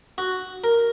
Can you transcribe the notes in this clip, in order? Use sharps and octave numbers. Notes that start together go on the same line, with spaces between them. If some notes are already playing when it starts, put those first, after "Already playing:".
F#4
A#4